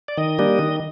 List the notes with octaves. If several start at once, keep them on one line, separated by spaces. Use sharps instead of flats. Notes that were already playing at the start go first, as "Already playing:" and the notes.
D5
D#3 D#5
G3 A#3 D4
D#3